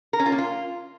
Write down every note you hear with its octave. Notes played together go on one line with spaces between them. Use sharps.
A#4
C#4
F4
A#3
F4